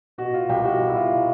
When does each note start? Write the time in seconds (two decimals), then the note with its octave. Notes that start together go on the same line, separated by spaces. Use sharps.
0.18 B2 F#4
0.33 B2 F4
0.49 C2 G4
0.65 B2 F#4
0.80 C2 F4
0.89 E4
0.96 B2 F4
1.12 B2